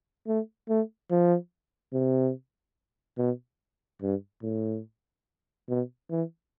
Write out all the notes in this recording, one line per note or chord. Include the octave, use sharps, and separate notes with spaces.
A3
A3
F3
C3
B2
G2
A2
B2
E3